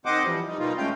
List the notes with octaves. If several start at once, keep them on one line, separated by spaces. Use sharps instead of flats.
D#3 C4 C5 D#5 F#5 D6
E3 F3 G3
G3 D#4
B2 G3 A#3 D#4 F4
G#3 A3 C#4 F5 G5